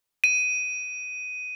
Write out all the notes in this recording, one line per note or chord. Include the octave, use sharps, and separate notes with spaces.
D#7